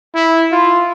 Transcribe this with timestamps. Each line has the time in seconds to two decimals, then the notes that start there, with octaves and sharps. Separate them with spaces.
0.15 E4
0.52 F4